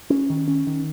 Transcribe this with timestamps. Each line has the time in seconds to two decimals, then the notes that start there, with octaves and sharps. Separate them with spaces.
0.10 C#4
0.30 D#3
0.48 C#4
0.67 D#3